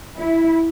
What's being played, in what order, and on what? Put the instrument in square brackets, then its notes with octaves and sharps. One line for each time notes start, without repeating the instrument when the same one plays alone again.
[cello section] E4